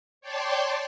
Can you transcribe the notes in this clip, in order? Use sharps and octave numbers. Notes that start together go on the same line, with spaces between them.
C#5 D5 G5 A5 C6 D6